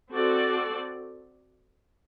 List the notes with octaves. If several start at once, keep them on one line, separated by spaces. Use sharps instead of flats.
C4 F#4 A4 D5